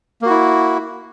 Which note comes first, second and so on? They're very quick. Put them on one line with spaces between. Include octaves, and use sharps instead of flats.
A#3 F#4 E4